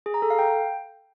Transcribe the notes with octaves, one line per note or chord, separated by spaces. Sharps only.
G#4
A#5
A4
F5
G5